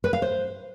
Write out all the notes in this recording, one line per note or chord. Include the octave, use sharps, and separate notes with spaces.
B4
F5
C5